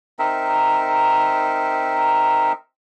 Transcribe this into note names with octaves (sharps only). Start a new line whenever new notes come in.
C4 D#4 A#4 E5